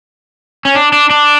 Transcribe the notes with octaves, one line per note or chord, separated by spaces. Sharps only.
C#4
D4
D4
D4